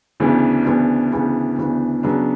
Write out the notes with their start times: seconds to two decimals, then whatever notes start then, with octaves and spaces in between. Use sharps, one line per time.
0.20 D2 C#3 E3 B3 D4
0.65 D2 C#3 E3 B3 D4
1.11 D2 C#3 E3 B3 D4
1.58 D2 C#3 E3 B3 D4
2.03 C#3 F#3 B3 D4